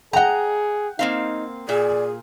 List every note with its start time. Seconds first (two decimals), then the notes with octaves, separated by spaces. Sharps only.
0.13 G#4 D#5 F#5 G5 A#5
0.99 A#3 C4 D#4 F5
1.69 A#2 G#4 D5